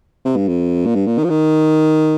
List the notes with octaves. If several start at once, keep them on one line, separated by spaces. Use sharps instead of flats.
C3
G2
F2
A#2
G2
A#2
D#3
F3
D#3